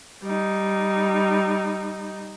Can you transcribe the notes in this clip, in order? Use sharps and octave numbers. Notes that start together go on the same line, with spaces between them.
G3 D#4